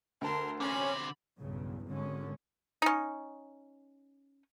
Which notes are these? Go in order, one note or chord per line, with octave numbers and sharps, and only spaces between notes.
D2 A#4 A5 C6
D3 C4 C#4 B5
B1 E2 G2 C#3
G#1 D3 G#3 C#4
C#4 D#4